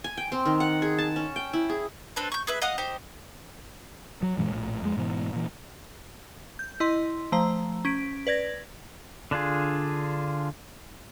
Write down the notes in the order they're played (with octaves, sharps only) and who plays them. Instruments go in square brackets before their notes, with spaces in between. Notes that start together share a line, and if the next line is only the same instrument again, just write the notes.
[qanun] G#5
G5
C4
D#3
F#5
G#4
A5
C#4
G5
E4
G#4
[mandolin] C4 D4 A4 B4
C#6 G6
G#4 B4 E5
D#5 F5 F#5 D#6
D#4 G4 C5
[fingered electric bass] F#3
F#2 A#2 E3 G#3
A#1 A2
F2 G#3
G#2 B2 E3
A#2 E3
[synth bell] G6
E4 D#5 C6
F3 A3 C5 A#5
C#4 B6 D7
B4 D5 G#6 A#6
[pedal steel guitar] D3 D4 F4 G#4